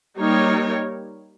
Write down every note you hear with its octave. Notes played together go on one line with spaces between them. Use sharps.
G3 A#3 D#4 A#4 C#5